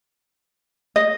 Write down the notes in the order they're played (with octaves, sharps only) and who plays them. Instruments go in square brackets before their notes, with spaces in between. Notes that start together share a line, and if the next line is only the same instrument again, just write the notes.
[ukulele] D#5